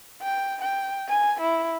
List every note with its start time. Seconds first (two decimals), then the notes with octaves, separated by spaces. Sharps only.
0.22 G5
0.62 G5
1.09 G#5
1.41 E4